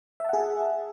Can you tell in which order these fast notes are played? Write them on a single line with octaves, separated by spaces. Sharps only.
E5 A5 F#5 G#4